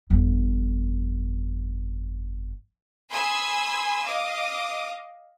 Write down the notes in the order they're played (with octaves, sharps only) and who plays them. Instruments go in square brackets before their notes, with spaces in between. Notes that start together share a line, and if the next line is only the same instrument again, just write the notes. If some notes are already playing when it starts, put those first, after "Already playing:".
[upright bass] G1 F2
[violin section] G#5 B5 C6 D#6 E6 G#6
D#5 F5 D6 D#6